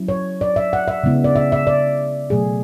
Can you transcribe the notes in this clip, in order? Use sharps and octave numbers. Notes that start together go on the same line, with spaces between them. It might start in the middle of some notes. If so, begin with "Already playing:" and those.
Already playing: F#3 C#4 E4
C#5
D5
E5
F#5
E5
C#3 G#3 B3 E4
D5
E5
E5
D5
B2 F#3 A3 G#4